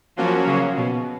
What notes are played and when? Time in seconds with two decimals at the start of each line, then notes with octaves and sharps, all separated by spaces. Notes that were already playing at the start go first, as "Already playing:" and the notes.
0.17 F3 F#3 A#3 C#4 F#4
0.47 C#3
0.76 B2